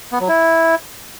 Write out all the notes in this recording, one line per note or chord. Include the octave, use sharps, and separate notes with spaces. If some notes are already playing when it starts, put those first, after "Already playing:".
B3
F#3
E4